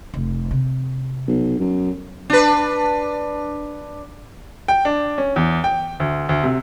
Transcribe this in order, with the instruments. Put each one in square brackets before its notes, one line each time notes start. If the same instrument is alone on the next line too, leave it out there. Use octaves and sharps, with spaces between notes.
[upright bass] F1
C3
[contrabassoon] B1
F#2
[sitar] D4 B4
[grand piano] G5
D4
C#4
E2
G5
D2
D2
C3